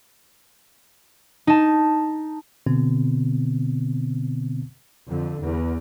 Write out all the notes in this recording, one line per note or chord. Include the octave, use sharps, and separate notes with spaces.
D#4 A5
B2 D3 B3 C4
F2 D3
E2